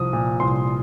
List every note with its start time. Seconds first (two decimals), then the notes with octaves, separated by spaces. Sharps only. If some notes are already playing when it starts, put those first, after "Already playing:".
Already playing: C2 F3 D#6
0.13 A#2
0.40 C2 C6